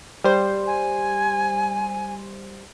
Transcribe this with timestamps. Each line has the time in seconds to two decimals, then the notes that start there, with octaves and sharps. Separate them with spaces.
0.24 G3 C5
0.67 G#5